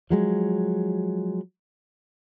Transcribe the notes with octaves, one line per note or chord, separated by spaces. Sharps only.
F3 F#3 G#3